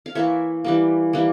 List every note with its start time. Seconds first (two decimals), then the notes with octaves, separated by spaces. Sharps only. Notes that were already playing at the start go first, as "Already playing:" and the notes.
0.06 F5
0.15 E3 A#3 C#5 E5
0.64 E3 G3 A#3
1.13 E3 G3 A#3